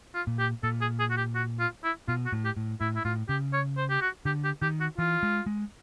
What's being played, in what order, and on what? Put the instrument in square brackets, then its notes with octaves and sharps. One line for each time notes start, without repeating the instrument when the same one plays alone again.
[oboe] F4
[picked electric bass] A#2
[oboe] G4
[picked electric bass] A#2 [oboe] A4
[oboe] G#4
G#4
F#4
G4
F#4
F4
E4
[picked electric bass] B2 [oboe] F4
[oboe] F#4
[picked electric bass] A2
[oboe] G4
[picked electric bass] A2
[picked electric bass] A2 [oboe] E4
[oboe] E4
[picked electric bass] A2 [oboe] F4
[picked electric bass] C#3 [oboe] G4
[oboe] C#5
C5
G4
F#4
[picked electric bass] D3 [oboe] G4
[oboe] G4
[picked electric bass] D#3 [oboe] G4
[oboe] F#4
[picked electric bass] E3 [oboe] F4
[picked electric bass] G#3
G#3